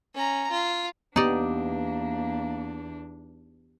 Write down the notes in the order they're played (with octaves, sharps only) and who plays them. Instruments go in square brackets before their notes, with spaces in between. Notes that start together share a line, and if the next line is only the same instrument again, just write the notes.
[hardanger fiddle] C#4 A#5
F4
[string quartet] E2 D4 [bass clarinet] A#3 [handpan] B3 G4 [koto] D#4 D5